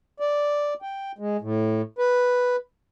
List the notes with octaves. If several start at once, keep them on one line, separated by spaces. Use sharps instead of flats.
D5
G5
G#3
A2
B4